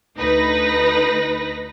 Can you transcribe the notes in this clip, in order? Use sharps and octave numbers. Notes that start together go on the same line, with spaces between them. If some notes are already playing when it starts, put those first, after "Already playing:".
D2 D#4 B4 A#6